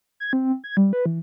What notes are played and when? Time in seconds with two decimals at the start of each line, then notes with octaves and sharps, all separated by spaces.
0.20 G#6
0.33 C4
0.64 G#6
0.77 G3
0.93 B4
1.06 E3